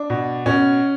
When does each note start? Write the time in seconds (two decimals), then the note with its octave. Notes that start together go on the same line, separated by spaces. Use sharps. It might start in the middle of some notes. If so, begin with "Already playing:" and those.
Already playing: D4
0.10 B2
0.46 B2 C#4